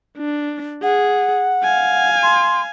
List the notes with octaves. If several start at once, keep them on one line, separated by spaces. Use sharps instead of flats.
D4
G#4 F#5
F5 G#5
C6